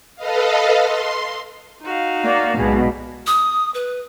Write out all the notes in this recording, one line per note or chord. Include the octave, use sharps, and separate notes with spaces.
A4 B4 D#5 F5
C6
D#4 F#4 F5
A#3 D5
B1 B2 G#3 G#4
D#6
B4